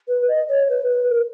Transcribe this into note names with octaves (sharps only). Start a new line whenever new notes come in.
B4
D#5
C#5
B4
B4
A#4